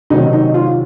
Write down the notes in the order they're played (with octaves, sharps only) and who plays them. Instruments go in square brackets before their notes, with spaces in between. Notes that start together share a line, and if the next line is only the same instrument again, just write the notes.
[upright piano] C3 D#3 F#3 D#4
D#4
F4